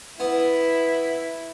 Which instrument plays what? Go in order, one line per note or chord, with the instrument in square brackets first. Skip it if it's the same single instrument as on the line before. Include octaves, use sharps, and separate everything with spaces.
[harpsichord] B3 [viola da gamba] E4